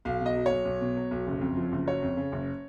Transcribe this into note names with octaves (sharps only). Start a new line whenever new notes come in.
B1 F5
B2 D#5
F#3
B1 C#5
B1
B2
F#3
B1
F#1
F2
F3
F#1
F#3 C#5
F2
C#3
F#1